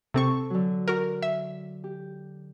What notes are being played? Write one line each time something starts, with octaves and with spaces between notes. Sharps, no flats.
C3 C4 A4 C#6
D3 F#3
F#4 A#4
E5
G4